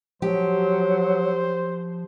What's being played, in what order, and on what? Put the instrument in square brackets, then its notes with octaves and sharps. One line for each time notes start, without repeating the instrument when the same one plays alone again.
[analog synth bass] F3 [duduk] F#3 [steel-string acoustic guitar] G4 [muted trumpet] C5